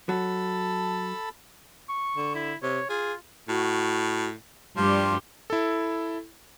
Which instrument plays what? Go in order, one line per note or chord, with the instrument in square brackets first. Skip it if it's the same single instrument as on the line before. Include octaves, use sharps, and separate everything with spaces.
[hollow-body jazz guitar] F#3 [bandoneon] A4 A5 B5
[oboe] C#6
[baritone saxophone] D3
[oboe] E4
[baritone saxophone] C3 [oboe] C#5
[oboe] F4 [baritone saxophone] G#4
[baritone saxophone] A2 [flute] F#4
[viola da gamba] G2 G3 G4 [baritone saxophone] F3 [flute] C6
[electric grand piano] E4 A4